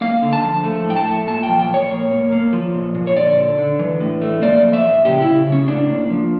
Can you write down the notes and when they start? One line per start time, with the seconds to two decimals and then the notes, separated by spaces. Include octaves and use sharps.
0.01 A#3 F5
0.22 D3
0.33 A5
0.43 F3
0.64 A3
0.85 A2
0.90 G5
0.96 A5
1.07 A3
1.27 A#2 A5
1.43 G5
1.48 F3
1.59 G5
1.69 A#2 C#5
1.91 A#3
2.11 A#3
2.32 A#3
2.53 F3
2.75 A#2
2.95 A#2
3.07 C#5
3.16 D3 D5
3.38 D3
3.58 D3
3.79 E3
4.00 A2
4.22 A3
4.42 A#3 D5
4.63 F3
4.73 E5
4.84 A#2
5.05 C#3 G4
5.21 C#3 E4
5.47 C#3
5.52 C#4
5.68 A2 D4
5.90 A#3
6.10 F3